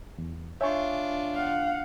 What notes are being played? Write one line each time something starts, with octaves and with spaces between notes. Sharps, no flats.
E2
D4 F4 C#5 E5 G#5 C#6
F5 F#5